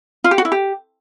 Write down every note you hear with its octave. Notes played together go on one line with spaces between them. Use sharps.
F4
G4
F#4
E4
G4